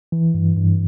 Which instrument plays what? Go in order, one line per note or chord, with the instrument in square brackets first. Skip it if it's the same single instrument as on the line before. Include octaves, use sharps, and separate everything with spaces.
[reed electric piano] E3
G2
G2